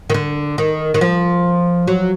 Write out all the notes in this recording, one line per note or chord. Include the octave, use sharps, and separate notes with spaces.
D#3
D3
D#3
D#3
F3
F#3